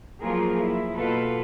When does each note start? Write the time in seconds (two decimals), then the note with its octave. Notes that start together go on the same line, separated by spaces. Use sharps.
0.21 F3 F#3 A#3 F4 G#4 A#4
0.61 E4
0.97 B2 A#3 F4 A4 B4